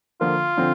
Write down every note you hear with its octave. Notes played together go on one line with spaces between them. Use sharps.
D3 F3 A#3 F4
D3 F3 C4